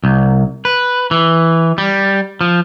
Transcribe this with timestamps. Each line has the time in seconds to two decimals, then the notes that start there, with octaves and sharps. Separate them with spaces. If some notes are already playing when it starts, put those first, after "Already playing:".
0.04 C2
0.65 B4
1.11 E3
1.78 G3
2.41 F3